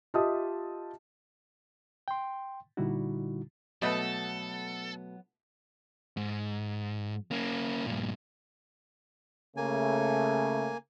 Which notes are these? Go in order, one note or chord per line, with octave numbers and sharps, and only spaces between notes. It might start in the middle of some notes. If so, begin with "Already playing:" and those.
F4 G4 D#5 E5 A5 D#6
G5 C6
A#2 D3 G3 D#4 E4 F#4
B2 F#3 A3 B3 A4 B4 D#5 F#5
G#2
A#3 C#4
G2 A#2
C#3 A3 A#3 G#5